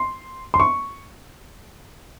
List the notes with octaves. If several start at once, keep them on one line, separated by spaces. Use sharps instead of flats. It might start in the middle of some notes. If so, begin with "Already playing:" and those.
Already playing: C6
C6
C#6